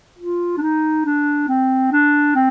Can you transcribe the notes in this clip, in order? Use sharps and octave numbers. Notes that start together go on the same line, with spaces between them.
F4
D4
D#4
D4
C4
D4
C4